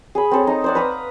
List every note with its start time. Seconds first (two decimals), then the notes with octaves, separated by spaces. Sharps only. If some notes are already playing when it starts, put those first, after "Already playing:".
0.15 G#4 B5
0.31 C4 A4 C#5
0.47 D#4
0.64 C5 D5 F#5
0.75 B4 F5 A#5 D#6